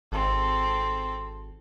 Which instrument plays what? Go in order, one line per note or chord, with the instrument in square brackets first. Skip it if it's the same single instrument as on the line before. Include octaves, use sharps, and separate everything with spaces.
[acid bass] G#1 [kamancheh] C4 A4